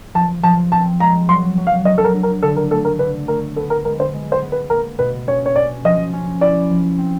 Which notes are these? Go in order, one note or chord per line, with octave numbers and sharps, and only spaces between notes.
F3 A5
F3 A5
C4 A5
G#3 A#5
F#3 C6
F#3
F5
F#3 D#5
A4
A#4
D4
A#4
D3 A4
A#4
A3 A4
A#4
D3 B4
A3 A#4
B3 A4
A#4
G#3 A#4
C5
G#3
C5
B3
B4
A#3 A#4
B2 B4
C#4 C#5
C#5
C#4 D5
F3 D#5
C#4
E4 D5
F3
C4